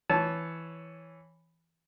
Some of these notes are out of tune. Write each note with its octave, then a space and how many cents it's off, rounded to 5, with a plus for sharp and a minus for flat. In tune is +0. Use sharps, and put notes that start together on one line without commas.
E3 +0 C#5 +0 A5 -15